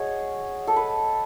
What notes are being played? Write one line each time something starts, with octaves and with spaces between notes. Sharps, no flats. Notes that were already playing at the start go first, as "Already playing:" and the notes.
Already playing: F#4 G#4 C#5 D#5
A4
B4